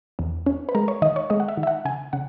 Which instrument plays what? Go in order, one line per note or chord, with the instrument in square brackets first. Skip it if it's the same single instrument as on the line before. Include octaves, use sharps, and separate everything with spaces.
[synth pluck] E2
C#4
B4
G#3 A#4
C#5
D#3 D#5
C#5
G#3 D#5
F#5
E5
D#3
E5
F#5
C#3 G#5
C#3 F#5